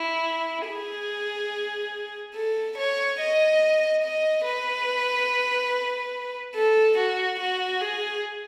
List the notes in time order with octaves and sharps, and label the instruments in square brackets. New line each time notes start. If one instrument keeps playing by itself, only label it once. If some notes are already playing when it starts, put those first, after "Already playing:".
Already playing: [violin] E4
G#4
A4
C#5
D#5
D#5
B4
A4
F#4
F#4
G#4